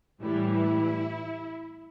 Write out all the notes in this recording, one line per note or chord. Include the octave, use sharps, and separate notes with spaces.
A2 E3 G3 E4
E4